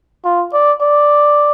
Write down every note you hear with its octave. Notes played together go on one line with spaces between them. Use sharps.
F4
D5
D5